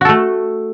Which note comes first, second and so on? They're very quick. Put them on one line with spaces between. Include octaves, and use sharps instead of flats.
F#4 A4 A3